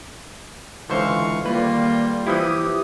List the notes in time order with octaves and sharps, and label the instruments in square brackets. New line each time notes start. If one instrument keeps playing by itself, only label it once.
[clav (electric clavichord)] C#2 D3 C5 [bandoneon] E3 C#6 [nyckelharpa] F5
[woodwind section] D3 D#3 A#3 [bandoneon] G3 [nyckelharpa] F4 [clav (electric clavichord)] B4
[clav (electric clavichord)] E3 F3 E4 [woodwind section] G4 [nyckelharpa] D#6